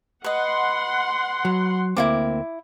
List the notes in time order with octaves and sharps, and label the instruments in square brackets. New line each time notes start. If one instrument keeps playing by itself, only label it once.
[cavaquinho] B4 D#5 [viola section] F#5 C6
[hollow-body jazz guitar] F#3
[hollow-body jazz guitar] D2 A#3 C4 [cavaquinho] E4 F4 D6